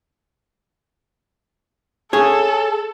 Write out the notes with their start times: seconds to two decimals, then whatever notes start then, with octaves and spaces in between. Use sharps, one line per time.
2.13 G#4 A4 C#5